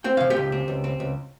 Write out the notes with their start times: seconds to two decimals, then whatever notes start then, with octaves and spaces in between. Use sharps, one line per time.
0.04 C4 G5
0.17 C3 F5
0.30 G4 G5
0.36 C#2
0.52 C4
0.68 C#2
0.84 C4
1.00 C#2